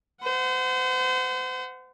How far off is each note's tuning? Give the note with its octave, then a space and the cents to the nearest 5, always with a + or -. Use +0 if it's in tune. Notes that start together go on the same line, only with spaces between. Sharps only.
C5 -35 F#5 +0